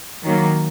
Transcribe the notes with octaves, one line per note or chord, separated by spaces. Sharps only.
D#3 F#3 A#3